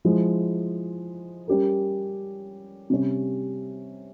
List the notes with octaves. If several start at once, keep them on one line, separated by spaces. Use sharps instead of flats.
F3 G#3 E4
G3 C#4 G4 A#4
C3 G3 C#4